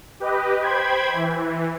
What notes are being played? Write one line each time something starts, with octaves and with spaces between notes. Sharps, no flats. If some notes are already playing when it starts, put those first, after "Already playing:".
G4 B4 D#5
C5 G5 B5 G#6
E3